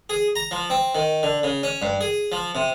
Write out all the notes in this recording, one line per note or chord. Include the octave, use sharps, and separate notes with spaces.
G#4
A#5
F3
C4
D#3
D3
C#3
C#4
G2
G#4
F3
C3